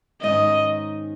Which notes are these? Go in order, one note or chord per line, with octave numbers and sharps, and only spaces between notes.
G#2 D#3 G#3 C#4 D#5